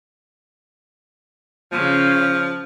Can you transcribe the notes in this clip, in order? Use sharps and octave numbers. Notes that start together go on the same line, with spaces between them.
C#3 F3